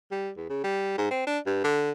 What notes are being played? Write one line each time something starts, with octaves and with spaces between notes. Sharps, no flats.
G3
E2
C#3
G3
G#2
C4
D4
G2
D3